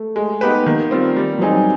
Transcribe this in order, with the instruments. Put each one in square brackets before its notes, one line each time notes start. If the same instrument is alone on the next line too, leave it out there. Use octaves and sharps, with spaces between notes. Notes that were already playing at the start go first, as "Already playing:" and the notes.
Already playing: [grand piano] A3
[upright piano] G#3
B3 D#4 G4 B4
[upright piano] D#3 [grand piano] A#3
[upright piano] G3 C4 F4
G3
[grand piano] F#3 [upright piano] C4 D#4 G#4
[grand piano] G3